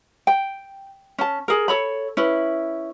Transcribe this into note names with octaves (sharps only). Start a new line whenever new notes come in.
G5
C#4 A5
G#4 A#4
A4 C#5 B5
C#4 E4 B4